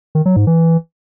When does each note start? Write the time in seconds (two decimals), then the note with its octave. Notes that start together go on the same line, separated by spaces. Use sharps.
0.15 D#3
0.26 F#3
0.36 G#2
0.47 E3